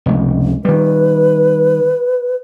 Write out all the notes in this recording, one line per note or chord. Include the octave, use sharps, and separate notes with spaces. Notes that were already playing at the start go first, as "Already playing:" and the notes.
F1 C#2
D#3 G3 B4